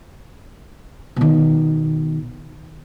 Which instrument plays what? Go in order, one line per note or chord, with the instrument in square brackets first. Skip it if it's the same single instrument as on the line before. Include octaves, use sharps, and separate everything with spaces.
[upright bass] B2 D#3